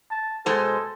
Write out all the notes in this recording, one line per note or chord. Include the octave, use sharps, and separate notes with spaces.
A5
B2 G#3 A4 C5